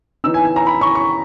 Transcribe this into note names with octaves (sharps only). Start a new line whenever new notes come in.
E3 B3 D#4 E6
G#5
G#5
A#5
B5
C#6
C#6